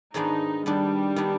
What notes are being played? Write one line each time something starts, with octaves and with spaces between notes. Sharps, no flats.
G#2 D#3 G#3 B3 D4 D#4
D#3 G3 B3 D4
D#3 B3 D4